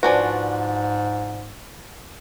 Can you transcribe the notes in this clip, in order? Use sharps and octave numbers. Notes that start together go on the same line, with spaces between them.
G#2 F3 D4 F#4 B4 D5 G#5